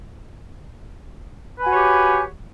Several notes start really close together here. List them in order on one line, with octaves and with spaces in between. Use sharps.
B4 G#5 F#4 C#5 G4